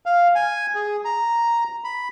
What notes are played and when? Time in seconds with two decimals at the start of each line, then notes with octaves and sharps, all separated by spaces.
0.06 F5
0.35 G#5
0.75 G#4
1.05 A#5
1.84 B5